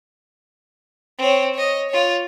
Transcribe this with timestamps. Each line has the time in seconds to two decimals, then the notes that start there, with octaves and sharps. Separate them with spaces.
1.18 C4 C#5
1.54 C#5 D#5
1.89 F4 C#5